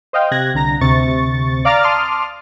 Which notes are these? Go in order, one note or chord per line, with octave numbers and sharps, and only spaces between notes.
C5 D#5 F5 G5
C3 G4 F#6 G#6 A#6
C2 D3 A#5 A#6
D2 C3 C#6 A6
D5 F5 A#5 D6 F6 A6
A5 C6 D6 D#6 F6